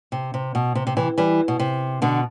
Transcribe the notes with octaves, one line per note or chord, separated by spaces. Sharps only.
C3
C3
B2
C3
C3
C3 E3
E3 G3
B2
C3
B2 D3